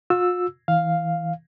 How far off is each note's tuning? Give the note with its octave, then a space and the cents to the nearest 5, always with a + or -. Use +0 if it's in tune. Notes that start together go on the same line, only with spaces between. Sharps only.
F4 +45 E6 +0
E3 -20 F5 +0